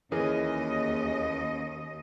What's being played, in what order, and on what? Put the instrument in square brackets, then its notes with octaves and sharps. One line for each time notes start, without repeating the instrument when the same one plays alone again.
[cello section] D#2 D#5 [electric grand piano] E3 G#4 A#4 [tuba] C#4